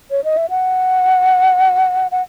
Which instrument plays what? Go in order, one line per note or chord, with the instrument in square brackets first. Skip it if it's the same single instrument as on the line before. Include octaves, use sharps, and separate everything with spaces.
[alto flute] C#5
D#5
E5
F#5
F#5